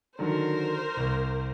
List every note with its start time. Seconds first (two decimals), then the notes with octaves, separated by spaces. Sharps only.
0.19 D3 D#3 F#3 A#4 C5
0.97 C2